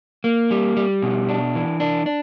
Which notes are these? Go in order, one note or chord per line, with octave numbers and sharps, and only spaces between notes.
A#3
G3
G3
B2
D4
E3
D4
D4